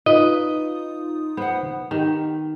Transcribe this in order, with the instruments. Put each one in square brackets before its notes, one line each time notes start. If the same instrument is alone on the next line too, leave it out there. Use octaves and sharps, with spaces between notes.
[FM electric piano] D#4 F4 D#6 [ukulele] B4 [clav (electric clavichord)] D#5
[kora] B3 [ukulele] C5 F#5
[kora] D#3 [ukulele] G4